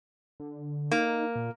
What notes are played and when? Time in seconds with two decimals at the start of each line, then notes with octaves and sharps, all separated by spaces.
0.40 D3
0.91 A#3 D#4
1.36 A#2